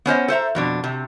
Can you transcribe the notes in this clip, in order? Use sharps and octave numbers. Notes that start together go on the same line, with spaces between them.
B3 C#4 C5 D#5
A4 C5 E5 A#5
F2 B2 D4
C3